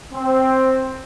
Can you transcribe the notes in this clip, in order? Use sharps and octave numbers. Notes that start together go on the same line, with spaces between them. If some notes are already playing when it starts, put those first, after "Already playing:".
C4